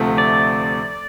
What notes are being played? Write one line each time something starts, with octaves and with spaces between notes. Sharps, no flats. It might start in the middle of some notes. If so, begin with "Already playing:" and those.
Already playing: D2 C3 F3 A3
D5